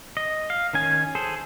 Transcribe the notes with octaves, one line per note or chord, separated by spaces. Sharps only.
D#5
F5
D#3 C#4 G#5
G#4 A4 C5